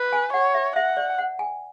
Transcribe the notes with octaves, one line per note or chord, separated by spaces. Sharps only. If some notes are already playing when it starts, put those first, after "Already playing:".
Already playing: B4
G#5
C#5 F#5
E5
E5 F#5
D5
F#5
G#5